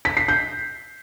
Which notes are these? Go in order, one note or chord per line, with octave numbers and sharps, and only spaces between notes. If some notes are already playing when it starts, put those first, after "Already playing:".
B6
C7
G6